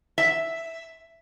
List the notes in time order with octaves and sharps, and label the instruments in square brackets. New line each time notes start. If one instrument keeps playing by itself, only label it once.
[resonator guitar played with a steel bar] E5